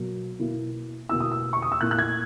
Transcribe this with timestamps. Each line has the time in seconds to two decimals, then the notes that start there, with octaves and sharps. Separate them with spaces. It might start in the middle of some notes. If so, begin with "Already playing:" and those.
Already playing: B2 F#3 A#3
0.39 B2 A#3 E4
1.09 B2 A#3 E4 E6
1.20 D#6
1.32 E6
1.53 C#6
1.62 D#6
1.72 E6
1.80 A#2 A#3 E4 F#6
1.91 F#6
1.99 G#6